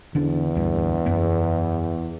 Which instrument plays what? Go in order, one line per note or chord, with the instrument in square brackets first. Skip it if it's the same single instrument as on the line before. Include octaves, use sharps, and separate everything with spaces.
[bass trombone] E2 [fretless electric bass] D3 C#4 D4
[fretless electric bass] D2 G2
F#2 B3